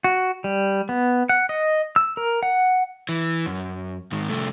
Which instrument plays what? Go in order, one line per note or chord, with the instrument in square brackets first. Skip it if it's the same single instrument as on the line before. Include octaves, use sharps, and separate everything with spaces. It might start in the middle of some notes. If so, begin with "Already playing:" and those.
[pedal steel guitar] F#4
G3
B3
F#5
D#5
E6
A#4
F#5
[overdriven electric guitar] E3
F#2
G#2 D#3
C2 A3